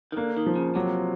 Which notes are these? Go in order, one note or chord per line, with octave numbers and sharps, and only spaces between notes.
D#3
D3 A#3
D#3
F3
C#3
C3 F#3